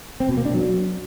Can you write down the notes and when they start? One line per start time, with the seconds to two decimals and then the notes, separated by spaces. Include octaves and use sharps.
0.20 C4
0.29 B2
0.37 A#3
0.46 D4
0.54 F#3